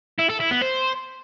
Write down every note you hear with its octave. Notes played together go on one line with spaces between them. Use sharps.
E4
A4
E4
B3
C5